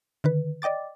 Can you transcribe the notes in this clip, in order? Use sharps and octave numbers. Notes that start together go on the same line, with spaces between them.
D3 D#3 B4
D5 D#5 G5 D6 A6